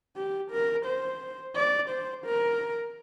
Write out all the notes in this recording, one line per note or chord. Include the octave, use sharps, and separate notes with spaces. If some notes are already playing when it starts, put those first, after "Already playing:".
G4
A#4
C5
D5
C5
A#4